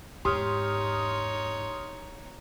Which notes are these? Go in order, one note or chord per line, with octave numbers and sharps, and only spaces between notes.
E2 G#2 D#4 G4 C#5 C6 D#6 F6